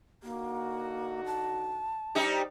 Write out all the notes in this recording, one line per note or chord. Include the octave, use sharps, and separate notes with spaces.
D3 A#3 D#4 F#4
A5
G3 D#4 G4 C5 D5